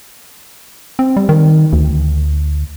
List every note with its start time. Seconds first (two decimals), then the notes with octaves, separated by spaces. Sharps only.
0.99 C4
1.17 G3
1.29 D#3
1.73 D2